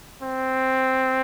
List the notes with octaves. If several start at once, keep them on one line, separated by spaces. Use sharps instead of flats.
C4